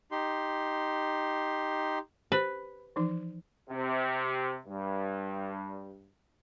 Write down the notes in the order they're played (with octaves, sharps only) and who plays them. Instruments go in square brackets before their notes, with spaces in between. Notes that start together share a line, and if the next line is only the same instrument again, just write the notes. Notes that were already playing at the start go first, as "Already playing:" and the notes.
[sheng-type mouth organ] D#4 G4 C6
[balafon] G4 C5 [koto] B4
[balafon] E3 F3 D#4
[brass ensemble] C3
G2